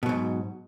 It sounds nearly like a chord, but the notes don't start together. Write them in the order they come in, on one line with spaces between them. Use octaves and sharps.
B2 F#3 G#2